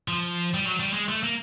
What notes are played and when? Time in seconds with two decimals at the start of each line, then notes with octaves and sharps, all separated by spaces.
0.08 F3
0.54 G3
0.66 F#3
0.80 G3
0.93 G#3
1.09 A3
1.23 A#3